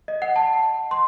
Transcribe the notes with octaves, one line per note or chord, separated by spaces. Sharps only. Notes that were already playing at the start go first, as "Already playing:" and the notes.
D#5
F#5
A5
C6